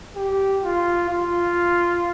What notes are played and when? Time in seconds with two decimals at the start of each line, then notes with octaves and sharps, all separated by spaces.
0.16 G4
0.63 F4
1.09 F4